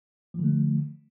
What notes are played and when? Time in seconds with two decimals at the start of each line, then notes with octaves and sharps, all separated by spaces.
0.34 F3
0.39 D3
0.44 A3